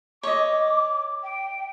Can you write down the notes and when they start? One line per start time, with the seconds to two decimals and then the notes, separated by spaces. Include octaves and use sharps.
0.23 C#5 D#5 D6
1.23 G5